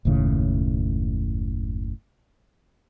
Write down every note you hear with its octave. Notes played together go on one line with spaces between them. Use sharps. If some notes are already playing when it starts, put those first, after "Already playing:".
F#1 D#2 A2 C#3